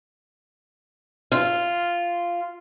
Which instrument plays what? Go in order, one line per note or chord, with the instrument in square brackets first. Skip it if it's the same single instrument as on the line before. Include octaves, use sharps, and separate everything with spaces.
[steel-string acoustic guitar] F4